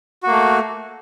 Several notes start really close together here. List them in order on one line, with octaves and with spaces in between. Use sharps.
F#4 A#3 A3